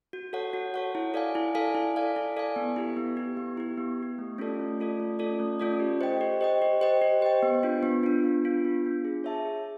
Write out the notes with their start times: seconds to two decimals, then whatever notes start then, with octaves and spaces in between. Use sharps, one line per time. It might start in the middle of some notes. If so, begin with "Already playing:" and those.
0.13 F#4
0.33 A4 C#5 F#5
0.53 F#4
0.74 A4 C#5 F#5
0.95 E4
1.14 A4 D5 F5 G#5
1.35 E4
1.55 A4 D5 F5 G#5
1.75 E4
1.96 A4 D5 F5 G#5
2.16 E4
2.37 A4 D5 F5 G#5
2.56 B3
2.76 E4 G4
2.97 B3
3.17 E4 G4
3.37 B3
3.57 E4 G4
3.78 B3
3.98 E4
4.03 G4
4.18 A3
4.38 C#4 F4 A4 D5
4.59 A3
4.79 C#4 F4 A4 D5
5.00 A3
5.19 C#4 F4 A4 D5
5.40 A3
5.60 C#4 F4 A4 D5
5.80 G4
6.01 C5 D#5 G5
6.21 G4
6.41 C5 D#5 G5
6.62 G4
6.81 C5 D#5 G5
7.02 G4
7.22 C5 D#5 G5
7.43 B3
7.63 D4 F4
7.83 B3
8.03 D4 F4
8.24 B3
8.44 D4 F4
8.65 B3
8.85 D4 F4
9.05 G#4
9.24 C#5 E5 A5
9.45 G#4